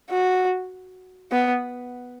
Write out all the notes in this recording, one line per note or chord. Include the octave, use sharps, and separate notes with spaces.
F#4
B3